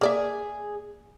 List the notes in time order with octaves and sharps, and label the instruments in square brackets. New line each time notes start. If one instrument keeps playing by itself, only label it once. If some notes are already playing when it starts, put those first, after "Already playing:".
[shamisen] A#3 D5 E5 [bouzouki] G#4